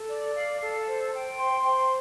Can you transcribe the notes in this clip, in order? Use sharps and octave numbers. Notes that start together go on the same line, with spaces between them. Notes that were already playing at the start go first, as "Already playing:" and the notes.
Already playing: A4
D5
F5
A4
C5
G5
C6
C5